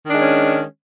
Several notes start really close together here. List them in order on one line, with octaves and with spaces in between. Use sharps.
D#3 D4 G#3 C#4